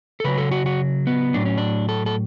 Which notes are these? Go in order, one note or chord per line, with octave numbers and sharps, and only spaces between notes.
A4
C#3 F#3 B4
A4
F#4
F#4
B3
A2 F#3 D4
C#4
D4
A4
A4